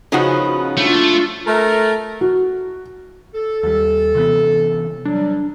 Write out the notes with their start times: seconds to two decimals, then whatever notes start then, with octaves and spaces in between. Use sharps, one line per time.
0.12 C#3 F3 B3 C#4 D#4 F#4
0.77 A3 D4 F4
1.46 A3 A#4
2.21 F#4
3.35 A4
3.63 D#2 G3
4.15 C3 E3 B3
5.05 F#3 G3 D4